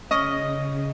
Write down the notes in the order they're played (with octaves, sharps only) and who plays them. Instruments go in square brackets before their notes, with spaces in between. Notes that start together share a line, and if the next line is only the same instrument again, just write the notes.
[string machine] C#3 [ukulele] C#4 [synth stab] D#5